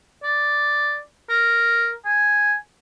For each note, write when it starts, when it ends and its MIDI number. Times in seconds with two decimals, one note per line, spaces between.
0.23 1.00 74
1.29 1.93 70
2.06 2.54 80